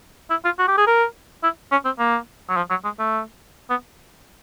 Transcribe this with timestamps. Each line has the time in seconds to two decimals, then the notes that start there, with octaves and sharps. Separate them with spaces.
0.30 E4
0.45 F4
0.59 F#4
0.68 G4
0.78 G#4
0.87 A#4
1.43 E4
1.72 C#4
1.85 C4
1.99 A#3
2.49 F#3
2.57 F3
2.70 F#3
2.84 G#3
2.99 A3
3.70 B3